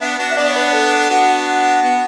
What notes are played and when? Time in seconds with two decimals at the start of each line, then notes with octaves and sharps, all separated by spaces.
0.01 B3 D4 E5
0.19 D4 F#4
0.32 E5
0.37 B3 D4 D5
0.49 C#5
0.56 B4
0.73 A4
1.10 B3 D4 F#4
1.83 B3